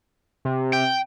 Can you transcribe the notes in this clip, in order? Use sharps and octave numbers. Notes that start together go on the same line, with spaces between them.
C3
G5